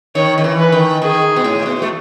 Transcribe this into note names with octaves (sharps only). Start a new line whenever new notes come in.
D#3 C#5
D#3
E3
B4
D#3
D#3 G#4
B2
A2
B2
A3